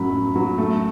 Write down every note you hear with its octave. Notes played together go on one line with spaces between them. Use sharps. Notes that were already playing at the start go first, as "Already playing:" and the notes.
Already playing: F#2 A2 F#3 B5
F#2
F#3
A3